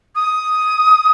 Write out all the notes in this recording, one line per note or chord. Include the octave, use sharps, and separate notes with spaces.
D#6